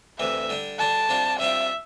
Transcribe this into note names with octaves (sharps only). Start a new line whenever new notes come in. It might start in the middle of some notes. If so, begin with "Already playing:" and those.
D2 C3 E3 E5
D3 G3 D4
D3 G3 D4 A5
C3 G3 D4 F4
C3 G3 D4 F4 E5